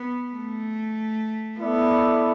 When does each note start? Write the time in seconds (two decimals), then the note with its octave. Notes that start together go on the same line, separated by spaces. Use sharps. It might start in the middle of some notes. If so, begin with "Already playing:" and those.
Already playing: B3
0.33 A3
1.60 B3 E4 A4 D5